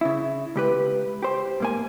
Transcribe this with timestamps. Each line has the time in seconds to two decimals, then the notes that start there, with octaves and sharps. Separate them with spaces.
0.01 C#3 E4
0.56 C#2 G4 B4
1.23 G4 C5
1.60 G#2 A#3 G#5